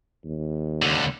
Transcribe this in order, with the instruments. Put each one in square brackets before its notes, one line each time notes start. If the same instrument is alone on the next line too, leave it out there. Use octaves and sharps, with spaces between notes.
[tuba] D#2
[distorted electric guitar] C#2 D3